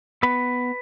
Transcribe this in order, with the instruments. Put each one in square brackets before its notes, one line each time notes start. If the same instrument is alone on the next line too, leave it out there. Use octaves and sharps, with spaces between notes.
[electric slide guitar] B3 B4